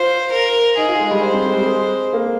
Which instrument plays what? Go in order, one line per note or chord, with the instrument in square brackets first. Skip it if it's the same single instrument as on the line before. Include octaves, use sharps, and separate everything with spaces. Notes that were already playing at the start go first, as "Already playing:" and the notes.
Already playing: [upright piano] F4 [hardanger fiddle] C5
[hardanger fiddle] A#4
[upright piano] D#4 [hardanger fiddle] G#4
[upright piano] F4
G#3
G3
[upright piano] G#3 [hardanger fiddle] C5
[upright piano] C4
G#3
G3
G#3
A#3